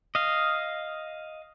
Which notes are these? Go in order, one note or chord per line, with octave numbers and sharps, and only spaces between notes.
D#5 F5